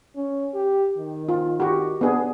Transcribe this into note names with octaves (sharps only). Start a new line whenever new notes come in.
C#4
G4
D#3
F4
F#4 G4
B3 D4 G#4